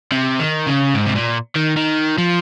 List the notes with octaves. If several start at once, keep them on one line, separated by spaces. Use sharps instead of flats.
C3
D#3
C#3
G#2
C3
A#2
D#3
D#3
F3